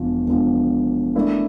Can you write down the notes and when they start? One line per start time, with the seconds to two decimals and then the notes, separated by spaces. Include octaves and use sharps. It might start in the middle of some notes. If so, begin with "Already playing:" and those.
Already playing: E1 E2 D3 F3
0.27 E1 E2 D3 F3
1.15 D3 A3 E4 A#4 D5